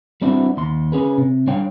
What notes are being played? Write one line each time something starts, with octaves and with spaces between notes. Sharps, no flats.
G3 C4 D4 E4 F#4
D#2 C6
C#4 G#4 B4
C3
G3 D4 C#5 F5 G5